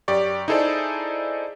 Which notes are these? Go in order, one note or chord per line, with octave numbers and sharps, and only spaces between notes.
F#2 G4 D5 C#6
D#4 E4 G#4 A4 C5 D5